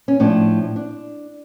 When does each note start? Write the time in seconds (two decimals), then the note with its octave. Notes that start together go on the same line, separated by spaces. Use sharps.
0.08 C#4
0.20 A2 F3 D4
0.76 D4